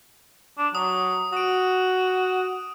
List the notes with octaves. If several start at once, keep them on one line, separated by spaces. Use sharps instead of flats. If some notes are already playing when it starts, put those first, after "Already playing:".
D4
F#3 D#6
F#4 D#6 D7